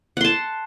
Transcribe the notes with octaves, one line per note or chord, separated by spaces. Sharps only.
F#5 A5 C6